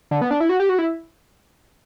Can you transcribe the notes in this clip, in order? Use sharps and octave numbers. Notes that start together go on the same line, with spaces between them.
D3
B3
D4
E4
F#4
G4
F#4
E4